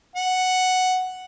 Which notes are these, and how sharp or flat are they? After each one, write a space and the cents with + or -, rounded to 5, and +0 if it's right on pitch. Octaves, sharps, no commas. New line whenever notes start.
F#5 +0